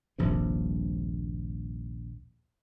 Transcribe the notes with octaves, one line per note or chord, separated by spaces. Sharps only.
D#1 A#1 G2 C3